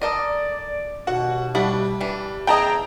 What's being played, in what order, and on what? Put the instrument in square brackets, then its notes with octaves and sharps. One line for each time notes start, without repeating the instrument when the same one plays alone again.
[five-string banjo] A4 A#4 D#5 [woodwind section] D5
[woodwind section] D#2 B2 [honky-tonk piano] F#4 F#5
[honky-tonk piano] G3 [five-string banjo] D4 E4 F#5
[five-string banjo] E3 D4
[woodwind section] E2 G#4 [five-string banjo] E4 D#5 [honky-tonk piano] G5 A5 A#5